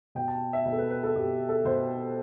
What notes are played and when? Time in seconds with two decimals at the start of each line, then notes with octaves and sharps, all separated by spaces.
0.15 B2 G5
0.28 A5
0.53 E5
0.65 B2
0.72 A4
0.78 B4
0.90 B4
1.03 A4
1.16 B2 G4
1.49 A4
1.65 B2 C5